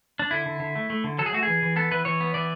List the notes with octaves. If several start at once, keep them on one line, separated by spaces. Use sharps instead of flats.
D4
D3 E4
D3
D3
A3
A3
D3
F#3 A4
G#4
A3 F#4
E3 G#4
E3
B3 A4
E3 B4
E3 C#5
B3
E3 D5